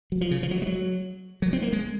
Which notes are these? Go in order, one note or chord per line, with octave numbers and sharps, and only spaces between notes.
F#3
F3
C#3
F3
F#3
G#3
F#3
F#3
C4
A#3
G#3